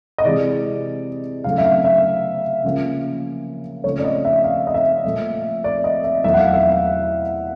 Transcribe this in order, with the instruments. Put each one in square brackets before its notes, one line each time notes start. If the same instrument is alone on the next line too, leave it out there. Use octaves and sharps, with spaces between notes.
[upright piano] D#5
C3 E3 G#3 D5
C#3 F#3 A3 F5
E5
F5
E5
C#3 F3 A#3
C#3 F3 A3 C#5
D5
D#5
E5
F5
D#5
E5
A#2 F3 A3
D5
D#5
E5
E2 B2 F#3 A3 E5
F#5
F5
E5
F5